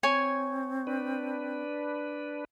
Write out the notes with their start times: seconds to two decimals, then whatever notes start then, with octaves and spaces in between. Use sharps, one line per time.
0.03 C4 C#5 G#5
0.87 D4 B4